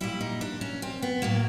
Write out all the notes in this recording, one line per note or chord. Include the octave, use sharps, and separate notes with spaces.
A#2 G3 E4
D#4
D4
C#4
C4
B3
A2 F#3 A#3